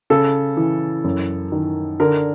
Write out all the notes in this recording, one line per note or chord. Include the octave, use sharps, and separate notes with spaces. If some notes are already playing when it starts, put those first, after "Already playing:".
C#3 A4
E3
F#2
D#3
D3 A#4